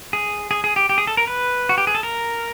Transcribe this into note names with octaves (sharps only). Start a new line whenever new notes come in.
G#4
G#4
G#4
G4
G4
G#4
A4
A#4
B4
F#4
G4
G#4
A4
A#4